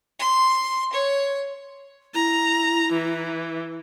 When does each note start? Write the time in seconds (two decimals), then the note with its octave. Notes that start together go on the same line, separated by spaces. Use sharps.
0.19 C6
0.93 C#5
2.14 E4 A#5
2.92 E3